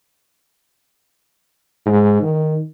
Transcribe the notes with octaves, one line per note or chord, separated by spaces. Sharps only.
G#2
D#3